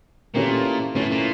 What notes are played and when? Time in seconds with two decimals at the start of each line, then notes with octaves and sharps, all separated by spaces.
0.34 A#2 E3 A3 C#4 G4 A#4
0.95 A2 E3 A3 C#4
1.11 A#2